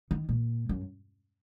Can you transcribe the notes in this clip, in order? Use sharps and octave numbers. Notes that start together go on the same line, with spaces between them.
D#3
A#2
F#2